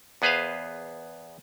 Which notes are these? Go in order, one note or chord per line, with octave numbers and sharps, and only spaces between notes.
E2 B3 G#4 B4 C5 F5